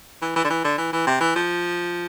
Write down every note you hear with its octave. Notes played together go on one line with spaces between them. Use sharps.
E3
E3
D3
E3
D3
E3
E3
C3
E3
F3